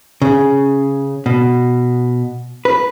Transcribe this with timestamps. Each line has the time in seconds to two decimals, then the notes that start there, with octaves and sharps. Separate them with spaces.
0.22 C#3
1.26 B2
2.65 B4